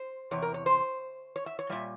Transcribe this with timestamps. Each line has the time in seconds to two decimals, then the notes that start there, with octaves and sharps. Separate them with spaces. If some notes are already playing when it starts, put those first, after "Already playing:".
Already playing: C5
0.31 E2 C3 C#5
0.42 A#4
0.54 C#5
0.66 C5
1.36 C#5
1.46 E5
1.59 C#5
1.69 A#2 G3 E5